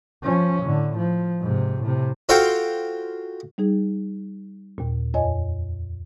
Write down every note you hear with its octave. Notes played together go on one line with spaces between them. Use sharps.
F3 C#4
A2 D3
F3
G#2 C3
A2 C3
F4 F#4 A4 C5 F5 G5
G3 D#4 G#4
D#2 A#2
F2 C#5 D#5 G#5